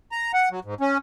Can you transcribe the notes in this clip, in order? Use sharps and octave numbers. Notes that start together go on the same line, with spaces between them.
A#5
F#5
F#3
G#2
C#4